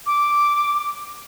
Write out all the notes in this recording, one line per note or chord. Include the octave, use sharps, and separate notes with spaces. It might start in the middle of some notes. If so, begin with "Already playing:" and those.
D6